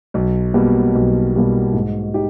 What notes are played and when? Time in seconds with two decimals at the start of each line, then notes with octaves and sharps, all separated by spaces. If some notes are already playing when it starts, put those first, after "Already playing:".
0.14 B1
0.54 B2 G3 A#3
0.95 B1
1.34 B2 G3 A#3
1.74 G#2
2.14 D#4 G4